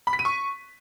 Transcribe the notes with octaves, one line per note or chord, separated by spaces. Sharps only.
B5
B6
D#7
C#6